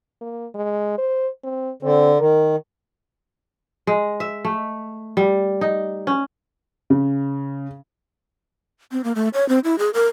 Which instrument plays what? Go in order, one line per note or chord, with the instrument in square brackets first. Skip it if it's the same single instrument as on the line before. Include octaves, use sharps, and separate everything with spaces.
[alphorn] A#3
G#3
C5
C4
[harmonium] D3 [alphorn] C4
[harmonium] D#3 [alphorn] A#4
[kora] G#3
E5
A3
G3
D#4
C#4
[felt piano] C#3
[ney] C4
A#3
A3
C#5
C4
E4
G#4
A#4